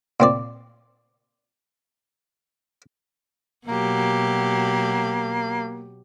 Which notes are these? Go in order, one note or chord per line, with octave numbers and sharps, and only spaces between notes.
A#2 C4 D5
B2 F#3 A#3 G4